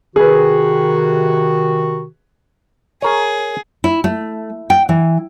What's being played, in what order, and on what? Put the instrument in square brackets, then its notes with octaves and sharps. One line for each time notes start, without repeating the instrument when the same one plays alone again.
[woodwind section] C3 D#3 F#4 [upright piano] G#4 B4
[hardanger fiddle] G#4 [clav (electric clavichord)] A#4 C#5
[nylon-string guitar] E4
A3
G5
E3